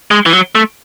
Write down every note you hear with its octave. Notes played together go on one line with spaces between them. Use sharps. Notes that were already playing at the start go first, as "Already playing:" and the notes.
G#3
E3
F#3
A3